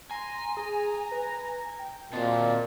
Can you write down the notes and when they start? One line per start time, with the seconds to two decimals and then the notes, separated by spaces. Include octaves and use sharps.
0.11 G#5 A#5 C6
0.57 G#4 A#5
1.11 B4
1.79 G5
2.13 A#2 C4 F#4 C5 D#5 A5